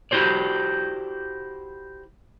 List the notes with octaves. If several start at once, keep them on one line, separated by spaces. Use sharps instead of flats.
E4 F#4 G4 C5 D5